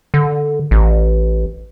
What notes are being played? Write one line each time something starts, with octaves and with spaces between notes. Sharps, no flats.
D3
A1